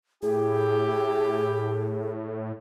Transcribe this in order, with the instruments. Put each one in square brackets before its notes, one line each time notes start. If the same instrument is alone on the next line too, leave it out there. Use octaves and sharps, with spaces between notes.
[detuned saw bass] A2 [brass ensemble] E4 G4 [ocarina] G#4